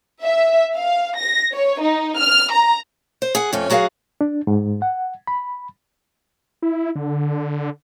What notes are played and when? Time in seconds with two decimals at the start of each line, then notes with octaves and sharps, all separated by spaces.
0.23 E5
0.75 F5
1.17 A#6
1.52 C#5
1.82 D#4
2.18 F6
2.52 A#5
3.22 C5
3.35 G#4 F#5
3.53 F2 A3 C#4
3.70 F#3 F#4 G#4 C5 F5 F#5
4.21 D4
4.47 G#2
4.82 F#5
5.27 B5
6.62 E4
6.96 D3